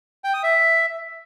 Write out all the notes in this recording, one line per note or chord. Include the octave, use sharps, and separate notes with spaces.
G5
D#6
E5